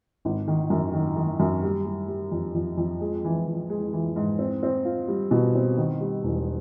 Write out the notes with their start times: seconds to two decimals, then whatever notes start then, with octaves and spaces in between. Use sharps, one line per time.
0.25 G#1
0.48 D#3
0.70 F#2
0.93 D#3
1.17 D#3
1.40 F#2
1.63 G3
1.86 G3
2.08 G3
2.31 F2
2.54 F2
2.77 F2
3.01 G#3
3.25 E3
3.47 E3
3.70 G#3
3.93 E3
4.16 G#2
4.39 C4
4.63 C4
4.85 F4
5.08 G3
5.31 B2
5.55 C4
5.77 D#3
6.00 G3
6.23 E1